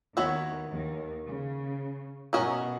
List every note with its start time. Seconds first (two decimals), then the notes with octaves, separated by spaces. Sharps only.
0.16 D#2 D#3 B3 F#4 C#5 E5
0.71 D#2 D#3
1.25 C#3
2.33 B2 F#3 C#4 F#4 A#4 D#5